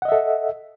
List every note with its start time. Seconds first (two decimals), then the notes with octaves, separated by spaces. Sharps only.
0.02 F#5
0.05 D#5
0.09 E5
0.12 A4